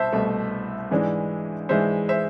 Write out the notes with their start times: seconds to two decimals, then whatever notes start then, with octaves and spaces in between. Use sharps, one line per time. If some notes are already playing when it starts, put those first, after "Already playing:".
Already playing: C2 B2 C5 E5 A5
0.12 C2 B2 A3
0.91 G#2 E3 G#3 D4
1.69 G#2 E3 G#3 D4 C5 E5
2.09 C5 E5